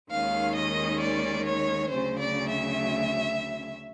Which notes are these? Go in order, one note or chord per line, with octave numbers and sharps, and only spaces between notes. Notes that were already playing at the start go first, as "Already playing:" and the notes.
D#2 D#3 G#3 C#4 F5
D#5
D5
C#5
D2 C#3 F#3 C5
D5
E5